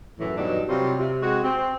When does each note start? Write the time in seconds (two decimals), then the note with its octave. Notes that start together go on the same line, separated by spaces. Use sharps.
0.20 F#2 A2 E3
0.37 G2 B2 F#3 D4 D#4
0.68 C3 F#3 G3 F4 C5
0.98 C3
1.21 C3 G#3 F#4
1.43 C4